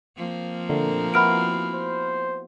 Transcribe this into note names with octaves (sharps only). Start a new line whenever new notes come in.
F3 A#3 C4
A#2 D3 A3 A#4
B3 E4 F#4 B5 F6 D7
C5